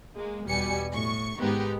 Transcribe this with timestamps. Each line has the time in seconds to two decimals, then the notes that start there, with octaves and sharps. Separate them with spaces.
0.15 G#3 A#3
0.46 E2 B2 G3 G#5 C#7
0.92 A2 C#6
1.39 G#2 D#3 G#3 B3 D#4 G4